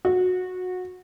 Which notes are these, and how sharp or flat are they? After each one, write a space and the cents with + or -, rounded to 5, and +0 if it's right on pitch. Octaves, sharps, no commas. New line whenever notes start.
F#4 -20